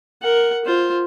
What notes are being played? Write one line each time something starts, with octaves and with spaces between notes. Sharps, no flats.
A#4 F#5
F4 C5